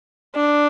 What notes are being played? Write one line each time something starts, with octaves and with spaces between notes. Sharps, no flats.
D4